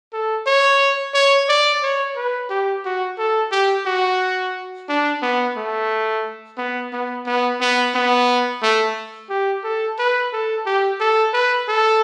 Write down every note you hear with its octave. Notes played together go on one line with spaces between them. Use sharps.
A4
C#5
C#5
D5
C#5
B4
G4
F#4
A4
G4
F#4
D4
B3
A3
B3
B3
B3
B3
B3
A3
G4
A4
B4
A4
G4
A4
B4
A4